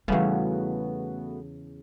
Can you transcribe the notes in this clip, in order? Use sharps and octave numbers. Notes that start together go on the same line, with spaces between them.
E2 C#3 G3 A3 B3 F4 F#4